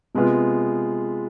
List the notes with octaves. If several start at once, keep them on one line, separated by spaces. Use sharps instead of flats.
C3 G#3 B3 F4